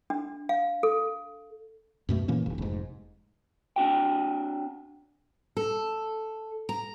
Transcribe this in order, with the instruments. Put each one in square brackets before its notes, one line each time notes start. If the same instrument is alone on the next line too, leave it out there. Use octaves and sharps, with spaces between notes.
[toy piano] D4
F5
A4
[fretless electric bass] F#2 B2 A3
A#2 E3 A#3 C#4
F1
F1 G#2
[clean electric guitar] C4 D4 F#4 G5
[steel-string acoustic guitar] A4
A#5